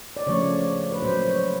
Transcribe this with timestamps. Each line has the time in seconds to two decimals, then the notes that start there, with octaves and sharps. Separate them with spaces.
0.17 D5
0.27 C#3 F3 A3 C#5
0.92 B4
1.02 A#2 F#3 A#3 C5
1.28 C#5